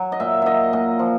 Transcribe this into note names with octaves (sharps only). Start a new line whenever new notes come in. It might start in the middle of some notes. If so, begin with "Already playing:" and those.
Already playing: F#3
D#5
A#2 E5
F#3 D#5 E5
A#2 D#5
F3